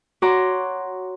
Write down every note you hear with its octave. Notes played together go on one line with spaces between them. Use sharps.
F#4 C#5 F#5 A#5 C6 D6